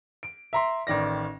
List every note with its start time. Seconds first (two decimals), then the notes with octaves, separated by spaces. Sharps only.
0.23 D7
0.53 E5 A#5 C6
0.87 A1 D#3 D5 A#6